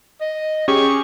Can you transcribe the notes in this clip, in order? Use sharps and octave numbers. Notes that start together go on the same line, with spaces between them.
D#5
C#4 G4 G#4 C#6